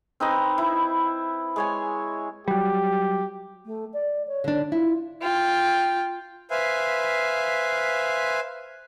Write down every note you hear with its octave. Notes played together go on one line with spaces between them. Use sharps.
C4 D#4 B4 D#5
E4
G#3 C#5 G#5
F#3 G3 G4
A3
D5
C#5
D3 D4
E4 F4
F4 G5
B4 C5 E5 F5 G#5